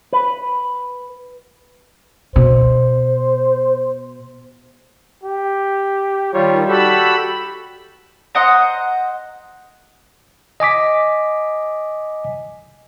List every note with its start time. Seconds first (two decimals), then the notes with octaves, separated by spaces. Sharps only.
0.13 B4
2.36 B2 C5
5.24 G4
6.34 D#3 G3 F4 C#5
6.69 F#4 G4 A4 B5 E6
8.35 C5 D#5 F#5 A#5
10.60 D#5 G#5 D6 B6